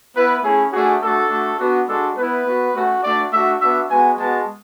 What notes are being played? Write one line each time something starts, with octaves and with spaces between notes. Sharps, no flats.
B3 E4 B4
A3 C#4 E4 G#4
A3 D4 F#4 G#4
A3 D4 F#4 A4
A3 D4 F#4
B3 D4 F#4
G#3 D4 F#4 A4
B3 E4 B4
B3 F#4
A3 C#4 F#4
A3 D4 F#4 D5
A3 D4 F#4 E5
B3 D4 F#4 E5
G#3 B3 F#4 G#5
G#3 B3 F#4 A5